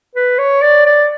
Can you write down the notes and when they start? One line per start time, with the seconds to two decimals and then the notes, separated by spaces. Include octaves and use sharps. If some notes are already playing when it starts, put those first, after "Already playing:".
0.15 B4
0.38 C#5
0.62 D5
0.86 D5